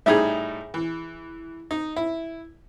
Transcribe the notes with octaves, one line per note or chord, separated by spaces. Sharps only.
A2 G3 D#4 G#4 E5
E3
D#4
E4